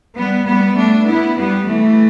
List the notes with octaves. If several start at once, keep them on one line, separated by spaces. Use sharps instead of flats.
G3 B3
G3 B3
A3 D4
B3 E4
G3 B3
E3 A3